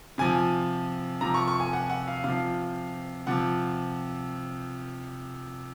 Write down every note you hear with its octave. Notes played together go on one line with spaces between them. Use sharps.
C3 F3 G#5
C3 F3 A#5
C#6
C#6
G#5
F#5
F#5
F5
C3 F3 F5
C3 F3 F#5